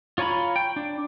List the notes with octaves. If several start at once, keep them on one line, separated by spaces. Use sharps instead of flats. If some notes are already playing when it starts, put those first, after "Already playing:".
F4 C#5 G#5 A#5 B5
G5
D4